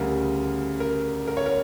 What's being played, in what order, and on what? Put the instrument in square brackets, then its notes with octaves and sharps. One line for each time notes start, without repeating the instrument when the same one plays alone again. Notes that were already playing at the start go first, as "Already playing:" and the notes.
Already playing: [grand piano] D2 C#3 G3 A#4
A#4
A#4
C#5
A#4